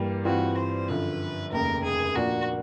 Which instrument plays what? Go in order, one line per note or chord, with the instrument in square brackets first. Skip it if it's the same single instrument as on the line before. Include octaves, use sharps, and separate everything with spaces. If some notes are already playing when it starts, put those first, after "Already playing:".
Already playing: [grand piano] G2 E3 G3 A#3
[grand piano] G2 E3 G3 C4 F4 [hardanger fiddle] F#4
[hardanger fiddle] C5
[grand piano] F#2 D3 F3 [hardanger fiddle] B4
[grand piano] F1 D#2 C#3 [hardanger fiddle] A#4
[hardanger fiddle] G#4
[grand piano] A#2 F3 A#3 D4 [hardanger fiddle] F#4